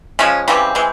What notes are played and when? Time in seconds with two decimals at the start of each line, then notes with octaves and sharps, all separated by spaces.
0.19 C#3 F3 G#3 C#4
0.48 C#3 E3 G3 C4
0.75 E3 G#3